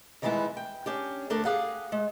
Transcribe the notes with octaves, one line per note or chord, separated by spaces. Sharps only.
D#3 E3 G3 G#3 B3 E4
G5
C#4 D4 G4
D2 A3 D4 A4 A#4
G4 G#4 F5 F#5
G#3